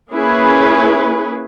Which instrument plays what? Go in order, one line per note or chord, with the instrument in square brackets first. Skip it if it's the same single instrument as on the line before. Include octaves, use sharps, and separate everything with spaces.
[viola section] A#3 C#4 E4 G#4 B4